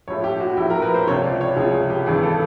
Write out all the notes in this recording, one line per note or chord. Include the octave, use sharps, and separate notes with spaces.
A#1 A2 F3 C#5
G4
F#4
A#1 A2 F3 E4
A#4
B4
C5
C#2 C3 F3 C#5
D5
C#5
C#2 C3 F3 G#4
G#4
G4
G#1 G2 E3 G#4
A4